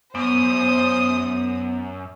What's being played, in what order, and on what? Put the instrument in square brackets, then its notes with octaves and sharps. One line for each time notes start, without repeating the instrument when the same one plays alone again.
[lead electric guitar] F#2 [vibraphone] B3 [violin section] C5 D#6